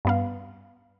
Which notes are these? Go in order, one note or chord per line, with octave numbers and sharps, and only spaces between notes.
G2 B3 F5